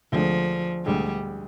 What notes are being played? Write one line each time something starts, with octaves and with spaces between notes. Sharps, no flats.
D2 D3 F3 G#3
D2 D3 G3 G#3